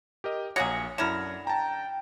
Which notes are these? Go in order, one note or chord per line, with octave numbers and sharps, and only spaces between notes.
G4 A#4 D#5
A#1 F#3 A#3 G#4 C#7
F#2 D3 E4 A#4 G#6 E7
G5 A5 A#5